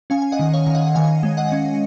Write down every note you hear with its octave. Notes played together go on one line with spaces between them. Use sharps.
C#4 F5 G#5
G#5
D#5 F#5
D#3
C#5 F5
D#3 F5
D#5 F#5
D#3 F5 G#5
G#3
D#5 F#5
C#4